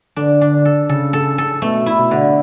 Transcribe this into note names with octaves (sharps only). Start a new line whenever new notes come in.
D3 D4
D4
A4
C#3 A4
A4
A4
B2 A3
E4
B2
D3